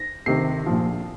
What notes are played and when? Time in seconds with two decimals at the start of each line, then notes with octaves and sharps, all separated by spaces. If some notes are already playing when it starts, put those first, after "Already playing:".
Already playing: A#6
0.26 D2 C3 D#3 C7
0.66 A#1 A#2 F3